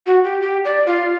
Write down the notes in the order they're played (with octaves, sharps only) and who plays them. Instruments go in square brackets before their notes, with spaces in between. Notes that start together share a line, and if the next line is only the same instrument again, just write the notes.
[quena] F#4
G4
G4
D5
F4